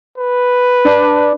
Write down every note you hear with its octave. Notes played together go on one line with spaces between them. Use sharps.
B4
D4